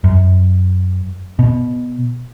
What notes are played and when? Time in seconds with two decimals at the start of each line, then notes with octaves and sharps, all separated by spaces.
0.04 F#2
1.39 B2